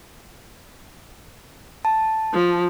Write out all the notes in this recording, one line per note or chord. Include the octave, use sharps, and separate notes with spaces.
A5
F3